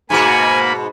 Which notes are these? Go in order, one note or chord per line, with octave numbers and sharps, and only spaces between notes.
G#2 B2 A#3 F#4 G#5 B5